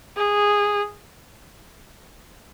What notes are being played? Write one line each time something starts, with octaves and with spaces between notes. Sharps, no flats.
G#4